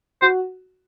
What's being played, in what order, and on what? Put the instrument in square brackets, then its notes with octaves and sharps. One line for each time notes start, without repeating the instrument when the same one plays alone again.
[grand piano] F#4 [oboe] C5